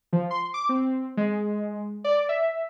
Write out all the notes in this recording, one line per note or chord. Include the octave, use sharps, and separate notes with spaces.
F3
C6
D6
C4
G#3
D5
E5